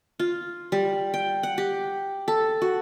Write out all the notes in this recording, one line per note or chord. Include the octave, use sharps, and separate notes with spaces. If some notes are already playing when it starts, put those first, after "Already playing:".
F4
G3
G5
F#5
G4
A4
F#4